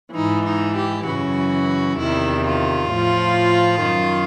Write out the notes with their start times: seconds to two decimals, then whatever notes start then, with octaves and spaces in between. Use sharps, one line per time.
0.14 G#2 E3 D#4
0.45 D#4
0.76 G4
1.06 F#2 C#3 E3 F#4
1.98 E2 C3 D#3 E4
2.45 F4
2.91 A2 F3
3.83 F#2 D#3